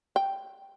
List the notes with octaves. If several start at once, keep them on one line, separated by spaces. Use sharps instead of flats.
G5